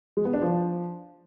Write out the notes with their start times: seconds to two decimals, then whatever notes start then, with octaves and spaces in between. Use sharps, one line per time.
0.17 G#3
0.25 B3
0.33 D4
0.42 F3